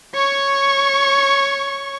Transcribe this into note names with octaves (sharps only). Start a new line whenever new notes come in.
C#5 C#6